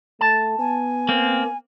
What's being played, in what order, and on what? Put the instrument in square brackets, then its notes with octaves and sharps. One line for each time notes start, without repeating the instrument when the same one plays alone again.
[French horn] A3 [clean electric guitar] A5
[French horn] B3 [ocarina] G#5
[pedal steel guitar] A#3 C4